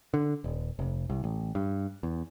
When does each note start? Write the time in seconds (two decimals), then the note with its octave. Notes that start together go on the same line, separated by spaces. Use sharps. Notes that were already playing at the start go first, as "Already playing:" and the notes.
0.14 D3
0.44 D#1
0.79 F1
1.10 C2
1.24 A1
1.55 G2
2.03 E2